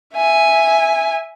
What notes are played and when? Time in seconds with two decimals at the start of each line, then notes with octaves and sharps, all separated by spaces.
0.15 E5 G#5